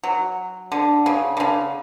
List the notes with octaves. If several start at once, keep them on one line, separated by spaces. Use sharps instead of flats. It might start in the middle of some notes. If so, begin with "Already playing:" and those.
F#3
D3
C#3
D3
C#3